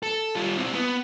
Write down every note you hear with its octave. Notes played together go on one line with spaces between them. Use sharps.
A4
G3 F4
C4 E4
B3